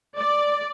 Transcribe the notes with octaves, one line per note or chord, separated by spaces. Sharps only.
D5